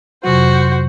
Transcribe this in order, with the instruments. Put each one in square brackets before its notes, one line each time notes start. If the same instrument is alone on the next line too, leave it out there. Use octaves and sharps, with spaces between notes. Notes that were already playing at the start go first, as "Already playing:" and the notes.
[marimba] F2 C3 F#3 [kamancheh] F#4 C5